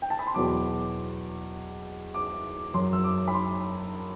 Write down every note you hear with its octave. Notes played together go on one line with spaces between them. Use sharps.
G5
A5
B5
C6
E2 B2 F#3 D6
D6
F#2 F#3 C6
E6
D6
B5
C6